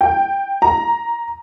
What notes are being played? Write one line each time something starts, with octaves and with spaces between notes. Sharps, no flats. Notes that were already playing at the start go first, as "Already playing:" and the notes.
G5
A#5